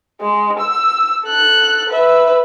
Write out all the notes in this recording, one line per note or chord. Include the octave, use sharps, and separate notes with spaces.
G#3
E6
A4 F#6
B4 E5